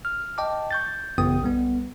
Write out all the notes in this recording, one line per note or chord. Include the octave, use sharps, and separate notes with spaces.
F6
D#5 G5 A5 D6
C#6 G6 A6
A1 F#2 C#3 B3 G5 D#6
B1 G3 B3